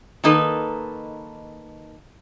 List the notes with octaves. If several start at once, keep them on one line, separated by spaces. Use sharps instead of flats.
D#3 A#3 D#4 A4 B4